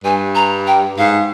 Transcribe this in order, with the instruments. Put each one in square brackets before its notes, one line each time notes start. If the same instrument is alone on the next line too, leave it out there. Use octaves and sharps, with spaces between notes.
[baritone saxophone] G2 [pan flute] G#5
[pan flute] A#5
G5
[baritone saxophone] G#2 [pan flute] F5